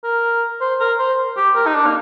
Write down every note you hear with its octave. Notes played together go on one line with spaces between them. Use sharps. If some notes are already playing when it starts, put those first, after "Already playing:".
A#4
C5
A#4
C5
G4
A#4
D#4
D4
A#3